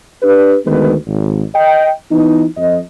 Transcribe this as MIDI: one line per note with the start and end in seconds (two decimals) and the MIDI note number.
0.22 0.57 62
0.22 0.57 67
0.22 0.57 71
0.65 0.94 38
0.65 0.94 51
0.65 0.94 56
0.65 0.94 59
0.65 0.94 71
1.07 1.42 32
1.55 1.90 75
1.55 1.90 79
2.11 2.45 52
2.11 2.45 59
2.11 2.45 63
2.57 2.81 41
2.57 2.81 75